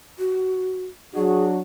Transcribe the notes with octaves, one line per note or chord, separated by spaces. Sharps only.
F#4
F#3 D4 F#4 G#4